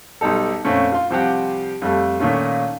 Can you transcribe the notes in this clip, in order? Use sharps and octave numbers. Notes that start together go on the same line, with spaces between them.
B1 G3 D#4 A4
F2 A#2 A3 C4 C#4
F4 C6
C2 F3 C4 G4 F#5
F2 G3 A3
A#2 D#3 A3 C#4 F4